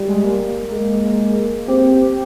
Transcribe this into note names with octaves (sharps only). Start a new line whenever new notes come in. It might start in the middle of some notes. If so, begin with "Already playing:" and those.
Already playing: G3
G#3
A#3
G#3
C4 G4